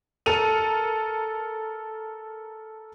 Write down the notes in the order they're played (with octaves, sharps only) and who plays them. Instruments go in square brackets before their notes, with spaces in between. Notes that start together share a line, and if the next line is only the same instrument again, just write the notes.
[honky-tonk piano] A4 A#4 D#7 F7